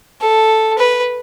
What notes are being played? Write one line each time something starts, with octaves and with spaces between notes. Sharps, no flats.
A4
B4